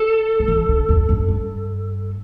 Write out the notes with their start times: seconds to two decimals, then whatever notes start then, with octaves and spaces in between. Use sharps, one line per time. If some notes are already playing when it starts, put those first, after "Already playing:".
Already playing: A4
0.39 F#3
0.48 E3
0.69 D3
0.89 E2
1.09 F#2
1.28 G2